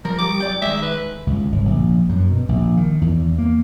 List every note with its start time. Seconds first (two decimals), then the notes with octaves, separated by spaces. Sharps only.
0.05 F3 A#4
0.19 G3 D6
0.40 F#3 D5 G5
0.62 D#3 G#3 E5
0.82 B4
1.27 C#2
1.52 G1
1.65 A#1
2.09 F#2
2.30 B2
2.49 A#1
2.77 D#3
3.02 E2
3.38 A#3